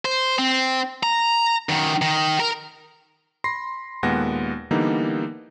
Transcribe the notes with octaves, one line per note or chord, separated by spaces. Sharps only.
C5
C4
A#5
F#2 D#3
D#3
A#4
B5 C6 A#6 C7
D#2 A#2 G#3 B3 F#5 A#6
D3 E3 G3 A#3 B3 D#4